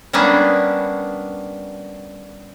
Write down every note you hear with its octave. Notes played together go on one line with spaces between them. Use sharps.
G3 A#3 B3 C#4 D4